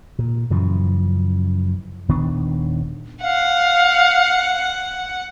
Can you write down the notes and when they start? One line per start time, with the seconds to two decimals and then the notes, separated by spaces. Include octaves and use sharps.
0.19 A#2
0.50 F#2 C#3 E3 F3
2.08 D#1 D#3 B3 D4
3.23 F5 F#5